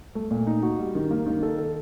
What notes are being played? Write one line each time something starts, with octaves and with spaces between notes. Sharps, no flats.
A3
A#2
D#4
F#4
G3
D#3
A#3
D#3
A4
A4